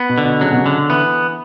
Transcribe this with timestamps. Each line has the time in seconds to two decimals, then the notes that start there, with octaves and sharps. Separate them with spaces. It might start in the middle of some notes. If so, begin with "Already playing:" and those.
Already playing: B3
0.09 B2
0.18 D3
0.25 B2
0.41 C#3 F#3
0.51 B2
0.57 C#3
0.66 D3
0.89 E3 B3